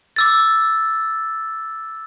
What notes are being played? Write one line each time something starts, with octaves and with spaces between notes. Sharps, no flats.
D6 E6 A6